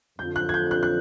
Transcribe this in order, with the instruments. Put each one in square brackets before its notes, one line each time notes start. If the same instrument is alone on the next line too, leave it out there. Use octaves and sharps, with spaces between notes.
[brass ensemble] F2 D3 F3 [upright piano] G6
[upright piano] F#6
G#6
G6
F#6
F#6